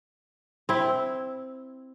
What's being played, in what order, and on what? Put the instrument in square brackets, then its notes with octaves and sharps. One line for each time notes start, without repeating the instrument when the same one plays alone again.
[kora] C4 E4